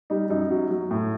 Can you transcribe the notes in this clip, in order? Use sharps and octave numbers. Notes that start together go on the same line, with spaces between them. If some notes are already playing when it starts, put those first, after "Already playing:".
G3 D#4
F#2 D#4
F#3
F#3
A2